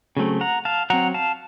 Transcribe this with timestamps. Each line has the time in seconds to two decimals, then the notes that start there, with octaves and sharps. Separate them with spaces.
0.17 C#3 F#3 A3 C4
0.41 F#5 A#5
0.65 F5 A5
0.90 F#3 C4 F#5 A#5
1.14 F5 A5